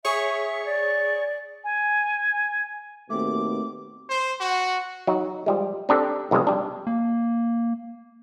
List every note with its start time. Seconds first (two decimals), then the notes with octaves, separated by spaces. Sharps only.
0.05 G#4 C#5 E5 C#6
0.65 D5
1.64 G#5
3.10 D#2 B2 A3 C4 D6
4.09 C5
4.40 F#4
5.07 F#3 D#4
5.46 F3 G3 G#3
5.89 C4 D4 G4 A4
6.31 B1 F2 C3 G3 G#3
6.47 G3 D4
6.87 A#3